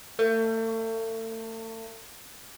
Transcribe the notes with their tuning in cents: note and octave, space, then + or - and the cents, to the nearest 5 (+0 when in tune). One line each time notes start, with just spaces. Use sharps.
A3 +35